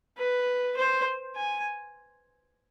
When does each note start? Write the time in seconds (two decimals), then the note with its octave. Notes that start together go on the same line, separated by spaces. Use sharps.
0.18 B4
0.77 C5
1.36 G#5